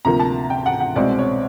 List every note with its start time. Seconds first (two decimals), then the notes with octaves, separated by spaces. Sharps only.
0.05 D2 C3 F3 A#3 A#5
0.20 A5
0.50 G5
0.66 F#5
0.80 F#5
0.96 C2 B2 G#3 C4 D5
1.19 C#5